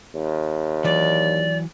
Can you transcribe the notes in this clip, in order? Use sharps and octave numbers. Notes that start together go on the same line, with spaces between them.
D#2
E3 F#3 D5